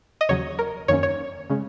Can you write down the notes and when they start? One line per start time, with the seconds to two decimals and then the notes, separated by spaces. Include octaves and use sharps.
0.21 D#5
0.29 D#2 C#3 F#3 C#5
0.59 A#4
0.88 F#2 D#3 A#3 C#4 C#5
1.03 C#5
1.50 C#3 G#3 C#4